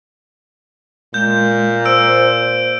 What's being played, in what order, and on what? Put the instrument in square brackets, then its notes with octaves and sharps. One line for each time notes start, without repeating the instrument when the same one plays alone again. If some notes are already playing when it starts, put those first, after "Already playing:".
[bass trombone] A#2 [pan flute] G#3 [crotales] G6
[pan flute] C5 [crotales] E6 D7